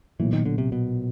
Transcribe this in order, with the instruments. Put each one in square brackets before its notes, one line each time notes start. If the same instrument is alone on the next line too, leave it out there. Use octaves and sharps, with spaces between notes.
[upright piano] B1 A#2 F#3 [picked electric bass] E3
[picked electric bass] D#3
D3
C3
B2